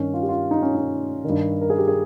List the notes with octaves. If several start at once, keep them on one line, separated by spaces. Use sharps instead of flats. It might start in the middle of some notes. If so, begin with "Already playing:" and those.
Already playing: G2 D#3 C#4
F4
G4
F4
D#4
C#4
D#4
G2 D#3
A#4
G#4
G4
G#4